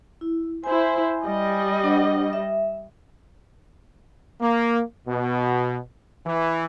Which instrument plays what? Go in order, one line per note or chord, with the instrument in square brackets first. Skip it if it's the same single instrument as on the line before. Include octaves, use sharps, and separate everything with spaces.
[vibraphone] E4
[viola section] E4 C5 [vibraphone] G#5
[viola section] G3 D#5
[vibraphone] D4 C5 F#5
E5
[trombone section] A#3
B2
E3